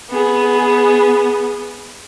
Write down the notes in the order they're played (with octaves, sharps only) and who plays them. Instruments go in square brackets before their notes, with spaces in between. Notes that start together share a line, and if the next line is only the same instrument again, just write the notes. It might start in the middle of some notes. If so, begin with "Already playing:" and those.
[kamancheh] B3 G#4